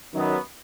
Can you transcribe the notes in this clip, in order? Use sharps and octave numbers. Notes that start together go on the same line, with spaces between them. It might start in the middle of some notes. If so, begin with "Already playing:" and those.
F#2 D#3 F#3 B3